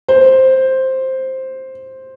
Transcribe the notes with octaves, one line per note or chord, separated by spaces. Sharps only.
C5